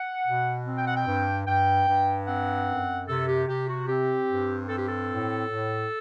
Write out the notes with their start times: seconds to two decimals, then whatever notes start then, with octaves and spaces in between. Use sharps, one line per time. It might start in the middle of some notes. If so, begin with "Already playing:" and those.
Already playing: F#5
0.26 B2
0.66 C4
0.77 G5
0.86 F#5
0.97 G5
1.06 G2
1.46 G2 G5
1.86 G2
2.27 C4 F#5
2.67 F#2
3.07 C3 A4
3.27 G4
3.47 C3 G4
3.68 F#4
3.88 C4 G4
4.28 G2
4.68 C4 A4
4.77 G4
4.87 A4
5.09 A2
5.49 A2